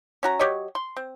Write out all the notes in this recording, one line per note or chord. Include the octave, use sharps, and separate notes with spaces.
C#4 F#4 A#5
F#3 G4 C#5 D#5
C6
C4